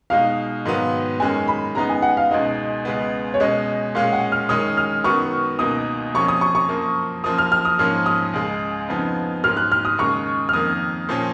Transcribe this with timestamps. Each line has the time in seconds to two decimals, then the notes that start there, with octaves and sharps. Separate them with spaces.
0.10 B2 G#3 D#4 F5
0.65 G#2 D#3 F#3 B3
1.20 F#2 D#3 G#3 C#4 G#5
1.48 B5
1.75 C#3 G#3 B3 D#4 A#5
1.89 G#5
2.02 F#5
2.17 F5
2.31 C#2 B2 G#3 D#4 D#5
2.85 C#2 C#3 G#3 B3
3.34 C#5
3.40 B2 G#3 C#4 D#5
3.95 A#2 G#3 C#4 F5
4.12 F#5
4.32 F6
4.49 F#2 D#3 G#3 C#4 D#6
4.77 F6
5.04 F#2 D#3 F#3 B3 C#6
5.59 C#2 B2 A#3 D#4 D#6
6.14 F2 F3 A#3 C#4 C#6
6.28 D#6
6.41 C#6
6.55 C#6
6.69 F#2 F3 A#3
7.24 F#2 F3 A#3 D#6
7.38 F6
7.52 F6
7.65 D#6
7.79 G#2 F3 A#3 C#4 F6
8.06 D#6
8.33 C#2 C#3 G#3
8.88 F2 C#3 F3 B3 D#4
9.43 G#2 F#3 A#3 F6
9.57 F#6
9.72 F6
9.85 D#6
9.98 D#2 C#3 G#3 C#6
10.49 F6
10.53 F2 D#3 A#3 D#6
11.09 A#2 F3 A#3 C#4